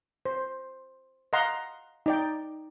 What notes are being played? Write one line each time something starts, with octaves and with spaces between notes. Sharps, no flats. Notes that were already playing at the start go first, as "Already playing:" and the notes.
C5
D#5 F5 F#5 A#5 C6
D#4 D5 G5